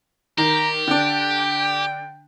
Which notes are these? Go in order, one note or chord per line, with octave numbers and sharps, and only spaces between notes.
D#3 G4 A#5
D3 D4 G5